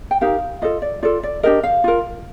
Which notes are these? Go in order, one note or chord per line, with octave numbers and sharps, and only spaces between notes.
G5
D#4 G4 A#4 F5
F4 A4 D#5
D5
F4 A4 D5
D5
D4 G4 A#4 D#5
F5
F4 A#4